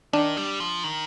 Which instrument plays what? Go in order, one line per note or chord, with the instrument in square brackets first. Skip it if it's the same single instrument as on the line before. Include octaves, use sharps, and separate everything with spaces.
[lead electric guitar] D#3 [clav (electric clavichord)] D4
[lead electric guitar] G3
F3
D#3